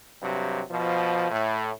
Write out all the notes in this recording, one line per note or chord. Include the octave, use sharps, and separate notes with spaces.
G2 C3 F#3
B2 F3
A2